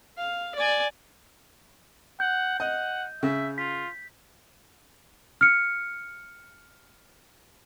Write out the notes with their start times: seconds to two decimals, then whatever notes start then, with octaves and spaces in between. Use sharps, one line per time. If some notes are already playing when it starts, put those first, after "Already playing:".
0.18 F5
0.55 D5 G#5
2.20 F#5 G6
2.60 D#5 F#5
3.23 C#3 E5
3.58 F4 B6
5.41 F6 C#7